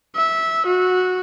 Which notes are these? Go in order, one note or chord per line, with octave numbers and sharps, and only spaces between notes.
E5
F#4